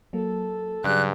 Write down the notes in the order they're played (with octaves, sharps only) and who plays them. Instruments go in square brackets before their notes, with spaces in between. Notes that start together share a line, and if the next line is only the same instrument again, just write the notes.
[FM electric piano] F#3 A#3 [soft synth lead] A4
[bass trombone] G2 [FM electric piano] C#3 F#3 G#4 [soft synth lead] D5 [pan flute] F#6